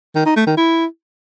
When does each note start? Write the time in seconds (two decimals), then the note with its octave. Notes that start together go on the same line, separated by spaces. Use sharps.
0.15 D#3
0.26 D#4
0.36 A3
0.47 D#3
0.57 E4